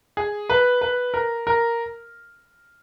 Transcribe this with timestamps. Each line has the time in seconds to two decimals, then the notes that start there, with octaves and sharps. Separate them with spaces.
0.17 G#4
0.49 B4
0.81 B4
1.14 A#4
1.47 A#4